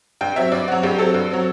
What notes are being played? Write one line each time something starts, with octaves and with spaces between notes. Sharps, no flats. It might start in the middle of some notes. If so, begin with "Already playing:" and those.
G2 G5
F#3 C4 E5
G2 D5
F#3 C4 F#4
G2 G4
F#3 C4 A4
G2
F#3 C4